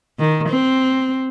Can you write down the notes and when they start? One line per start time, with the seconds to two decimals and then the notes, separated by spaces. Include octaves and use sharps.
0.19 D#3
0.49 C4